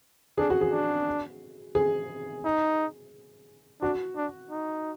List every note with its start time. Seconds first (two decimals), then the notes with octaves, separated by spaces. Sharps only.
0.38 D4 G#4
0.50 F#4
0.61 G#4
0.72 D4
1.75 G#4
2.45 D#4
3.82 D4 F#4
4.17 D4
4.51 D#4